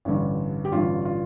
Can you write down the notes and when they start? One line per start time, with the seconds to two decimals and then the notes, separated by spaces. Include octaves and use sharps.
0.05 A1 G2 D3
0.65 G4
0.72 A1 G2 D3 F4
1.05 F4